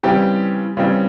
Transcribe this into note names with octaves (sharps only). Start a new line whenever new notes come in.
C#3 E3 G3 C4 G4
C#3 E3 G3 C4